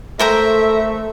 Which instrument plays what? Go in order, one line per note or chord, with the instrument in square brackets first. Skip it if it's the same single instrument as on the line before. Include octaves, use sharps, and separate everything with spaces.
[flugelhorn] A3 [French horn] A4 [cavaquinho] A#4 C5 A#5 [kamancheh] E5